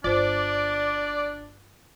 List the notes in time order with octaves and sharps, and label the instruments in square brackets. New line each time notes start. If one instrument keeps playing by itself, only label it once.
[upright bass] G1 [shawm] D4 [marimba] F4 C5 [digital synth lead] D5